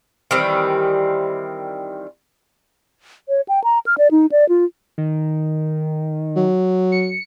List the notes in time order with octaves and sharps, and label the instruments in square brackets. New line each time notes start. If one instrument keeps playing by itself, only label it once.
[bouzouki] D#3 E3 G3 C4
[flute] C#5
G5
A#5
F6
D5
D#4
D5
F4
[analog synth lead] D#3
[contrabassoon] F#3
[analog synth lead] C#7